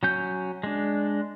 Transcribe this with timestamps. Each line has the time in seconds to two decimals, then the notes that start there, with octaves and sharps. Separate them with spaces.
0.03 F#3 C#4 G6
0.63 G#3 D4